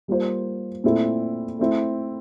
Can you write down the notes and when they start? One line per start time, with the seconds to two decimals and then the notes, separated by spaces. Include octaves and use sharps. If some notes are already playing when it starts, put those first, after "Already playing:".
0.08 G3 A#3 F4 C5
0.84 A#2 A3 C4 E4 A4
1.59 A3 C4 E4